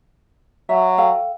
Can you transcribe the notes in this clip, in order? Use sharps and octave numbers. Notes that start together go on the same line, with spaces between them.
F#3 E5
A4 F5 G5